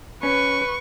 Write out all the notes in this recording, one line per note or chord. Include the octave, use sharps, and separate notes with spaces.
C#4 B4 C#6